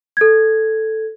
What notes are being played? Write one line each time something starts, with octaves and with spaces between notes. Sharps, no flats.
A4 G#6